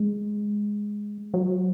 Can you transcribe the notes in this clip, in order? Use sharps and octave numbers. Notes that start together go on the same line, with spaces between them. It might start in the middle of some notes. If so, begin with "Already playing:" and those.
Already playing: G#3
F#3